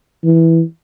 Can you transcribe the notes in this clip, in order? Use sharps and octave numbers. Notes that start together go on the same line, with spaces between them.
E3